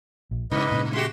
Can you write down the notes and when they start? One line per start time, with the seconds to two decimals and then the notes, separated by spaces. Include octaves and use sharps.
0.31 A#1
0.52 G2 C#3 B4 D#5
0.72 A#2 C#3
0.94 G#3 F#4 G4 C6